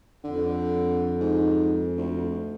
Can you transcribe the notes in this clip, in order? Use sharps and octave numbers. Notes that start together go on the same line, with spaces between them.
F2 D3
G#2
D2